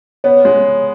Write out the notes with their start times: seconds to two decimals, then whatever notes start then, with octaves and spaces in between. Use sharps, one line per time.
0.24 B3 C#5
0.45 G#3